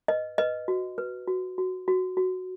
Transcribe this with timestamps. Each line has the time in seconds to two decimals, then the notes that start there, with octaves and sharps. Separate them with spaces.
0.08 B4 D#5
0.38 B4 D#5
0.68 F#4
0.98 B4
1.27 F#4
1.58 F#4
1.88 F#4
2.17 F#4